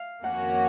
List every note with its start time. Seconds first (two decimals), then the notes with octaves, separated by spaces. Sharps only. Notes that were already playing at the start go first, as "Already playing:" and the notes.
Already playing: F5
0.23 F2 D#3 A#3 C#4 F#4 F#5